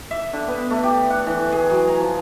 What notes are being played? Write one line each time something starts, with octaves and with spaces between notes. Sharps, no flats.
E5
D3
B3
A3
G4
F#5
E3
G#4
F#3
A#5
F3